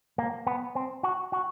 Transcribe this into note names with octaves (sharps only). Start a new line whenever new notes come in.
A#3
B3
C4
F#4
F#4